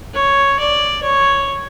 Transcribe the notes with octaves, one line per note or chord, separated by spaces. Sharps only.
C#5
D5
C#5